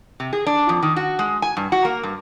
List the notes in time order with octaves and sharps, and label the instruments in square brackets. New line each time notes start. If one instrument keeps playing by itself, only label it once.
[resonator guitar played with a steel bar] C3
G#4
D4
F2
D#3
F#4
G#3
G#5
G2
F#4
A#3
G2